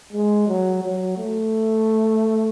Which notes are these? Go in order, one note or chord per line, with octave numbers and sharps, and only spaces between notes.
G#3
F#3
F#3
A3